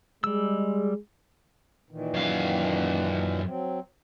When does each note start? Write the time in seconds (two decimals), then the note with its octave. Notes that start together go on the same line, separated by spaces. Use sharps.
0.24 G3 G#3 E6
1.91 A#2 D#3 E3
2.14 F#2 F5
3.46 F#3 C4